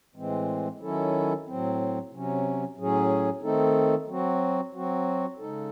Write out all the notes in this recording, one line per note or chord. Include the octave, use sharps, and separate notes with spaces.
A2 E3 G#3 C4
D#3 F#3 C#4 E4 A4
A2 F#3 C4
C3 F#3 C#4
A2 F#3 C#4 G#4
D#3 A3 C4 D#4 A4
F#3 C4 F#4
F#3 C4 F#4
C#3 G#3 D#4 A4